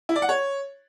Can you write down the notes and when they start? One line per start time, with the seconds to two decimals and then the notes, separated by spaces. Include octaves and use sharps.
0.09 E4
0.16 D5
0.22 F#5
0.29 C#5